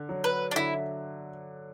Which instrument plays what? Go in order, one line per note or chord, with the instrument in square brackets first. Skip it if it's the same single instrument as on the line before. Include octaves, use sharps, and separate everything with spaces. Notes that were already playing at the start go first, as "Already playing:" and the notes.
Already playing: [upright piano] D3
F#3
[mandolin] B4
D4
[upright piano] D3 [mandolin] E4